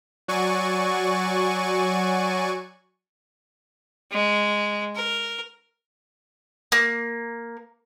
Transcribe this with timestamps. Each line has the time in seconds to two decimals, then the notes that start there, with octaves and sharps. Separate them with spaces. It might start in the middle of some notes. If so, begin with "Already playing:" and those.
0.28 F#3 F#4 D5 G#5 C#6 D#7
4.12 G#3
4.95 A#4
6.72 A#3